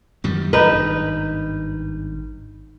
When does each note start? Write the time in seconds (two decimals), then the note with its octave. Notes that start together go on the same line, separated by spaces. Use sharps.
0.24 F#2 D#3 G3
0.53 G#1 G2 D#4 B4